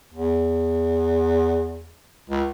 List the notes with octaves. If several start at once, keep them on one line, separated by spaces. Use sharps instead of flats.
E2
C#2